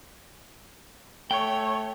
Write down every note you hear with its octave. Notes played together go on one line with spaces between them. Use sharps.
A3 C#5 G5